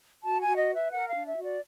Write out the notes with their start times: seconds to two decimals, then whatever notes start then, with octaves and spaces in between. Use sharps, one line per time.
0.24 F#4 A5
0.41 G#5
0.47 F#4
0.58 D#5
0.70 B4
0.75 E5
0.92 A#4 F#5
1.09 F5
1.14 D4
1.26 E5
1.37 F#4
1.43 D5